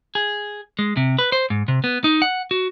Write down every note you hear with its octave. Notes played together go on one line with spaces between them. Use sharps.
G#4
G#3
C3
B4
C5
G#2
C3
B3
D#4
F#5
F#4